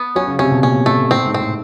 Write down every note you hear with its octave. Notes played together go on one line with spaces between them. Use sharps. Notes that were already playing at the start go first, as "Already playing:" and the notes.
Already playing: B3
F#3 C#4
C#3
C3 C#4
B2
A#2 C#4
A2 A3
A2 C4
G#2
C4
A2